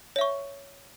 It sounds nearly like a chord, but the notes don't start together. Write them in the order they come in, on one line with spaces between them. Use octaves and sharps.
C#5 E5 C#6